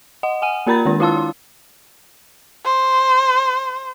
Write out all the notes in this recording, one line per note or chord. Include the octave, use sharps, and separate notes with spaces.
D#5 F#5
F#5 G#5 D#7
A#3 F4 A#4 A#5 B5 A6
D#3 G#3 D4
E4 F4 F5 A5 C6 E6
C5